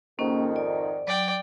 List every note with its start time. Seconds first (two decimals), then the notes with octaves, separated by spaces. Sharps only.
0.19 F2 G#2 D#3 A#3 C#4
0.56 D5
1.07 F#3 D5 G5